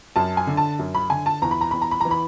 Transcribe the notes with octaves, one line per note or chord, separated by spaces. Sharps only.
F#2 A5
G#5
D3
A5
F#2
B5
D3 G#5
A5
E2 A#5
B5
A#5
E2 B5
A#5
B5
E3 A#5
B5